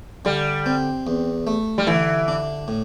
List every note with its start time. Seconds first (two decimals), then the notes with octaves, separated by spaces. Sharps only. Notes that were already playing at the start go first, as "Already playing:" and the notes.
0.25 D3 G3
0.66 C4
1.07 E2
1.47 A3
1.78 G3
1.87 D3 E3
2.28 D4
2.68 A2